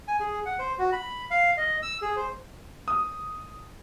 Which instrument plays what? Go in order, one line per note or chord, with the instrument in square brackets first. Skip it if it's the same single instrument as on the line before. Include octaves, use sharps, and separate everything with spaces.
[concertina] G#5
G#4
F#5
C5
F#4
B5
F5
D#5
E6
G#4
C5
[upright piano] D#6